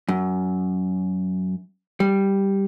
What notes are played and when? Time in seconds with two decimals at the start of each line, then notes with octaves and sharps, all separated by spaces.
0.08 F#2
2.00 G3